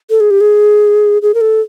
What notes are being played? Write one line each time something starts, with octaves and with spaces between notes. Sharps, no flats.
A4
G#4
G4
G#4
G#4
A#4
A4